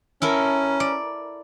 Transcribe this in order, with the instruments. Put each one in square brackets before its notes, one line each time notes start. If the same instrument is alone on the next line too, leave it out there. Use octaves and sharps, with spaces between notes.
[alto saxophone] C#4 [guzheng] E4 A4 A#4
[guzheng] D5